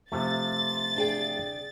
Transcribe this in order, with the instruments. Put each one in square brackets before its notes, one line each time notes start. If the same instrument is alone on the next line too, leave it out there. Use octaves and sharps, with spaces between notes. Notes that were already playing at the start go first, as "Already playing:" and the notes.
[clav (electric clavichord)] C3 F3 A3 [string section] A6
[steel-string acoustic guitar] D4 G#4 G5